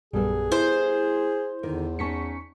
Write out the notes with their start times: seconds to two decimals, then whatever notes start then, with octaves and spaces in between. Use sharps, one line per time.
0.13 A#1 F#2 G3 B3 G#4 A4
0.52 E4 C5
1.63 E2 D3 D#3 A#4
1.99 C#4 D#4 A5 C#6 B6 C#7